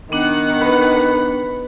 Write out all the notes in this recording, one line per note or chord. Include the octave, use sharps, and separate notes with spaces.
D#3 B3 D4 F#5
B4